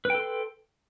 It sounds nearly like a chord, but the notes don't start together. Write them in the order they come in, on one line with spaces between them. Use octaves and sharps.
B4 G5 A4 C6